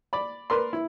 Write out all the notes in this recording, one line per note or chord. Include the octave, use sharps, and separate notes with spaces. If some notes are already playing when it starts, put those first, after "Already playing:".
D5 B5
A#4 B4 D5 C6
E4